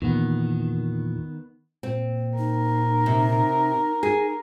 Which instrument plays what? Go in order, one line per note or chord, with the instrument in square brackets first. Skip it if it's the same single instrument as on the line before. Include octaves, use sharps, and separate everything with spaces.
[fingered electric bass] E2 A#2 [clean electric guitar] D#3 B3
[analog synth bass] A#2 [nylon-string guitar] C4
[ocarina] D#4 [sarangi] A#4
[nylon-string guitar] C3
G#4